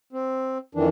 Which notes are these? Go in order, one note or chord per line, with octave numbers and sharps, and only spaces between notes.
C4
F2 D#3 E3 D4